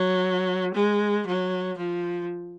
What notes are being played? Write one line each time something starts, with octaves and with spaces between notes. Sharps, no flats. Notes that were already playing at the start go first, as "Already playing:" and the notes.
Already playing: F#3
G#3
F#3
F3